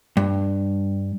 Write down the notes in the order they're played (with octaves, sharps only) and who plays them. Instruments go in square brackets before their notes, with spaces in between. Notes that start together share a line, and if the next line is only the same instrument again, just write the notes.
[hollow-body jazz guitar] G2